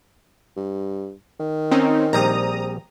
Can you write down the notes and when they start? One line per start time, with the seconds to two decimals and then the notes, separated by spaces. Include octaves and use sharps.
0.57 G2
1.40 D#3
1.71 C4 C#4 D#4
2.13 A#1 G3 C4 A#5 D#6